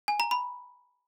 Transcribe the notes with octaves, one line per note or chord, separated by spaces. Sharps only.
G#5
A#5
B5